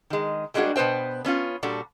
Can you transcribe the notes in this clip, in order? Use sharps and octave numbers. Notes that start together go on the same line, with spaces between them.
D#3 G#3
G3 G#3 A#3 D4 F#4 G#4
B2 B3 B4 C5 G5
B3 C#4 E4 F4
A#2 G3 D4 F#4 A4